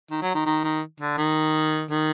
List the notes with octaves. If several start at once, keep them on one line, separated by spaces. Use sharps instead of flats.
D#3
F#3
D#3
D#3
D#3
D3
D#3
D#3